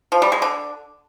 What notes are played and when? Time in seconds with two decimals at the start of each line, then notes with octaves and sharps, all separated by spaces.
0.12 F3
0.22 G3
0.32 G#3
0.42 D3